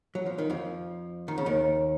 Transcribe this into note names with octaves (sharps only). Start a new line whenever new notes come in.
F#3
F3
D#3
F2 F3
D#3
C#3
D#2 D#3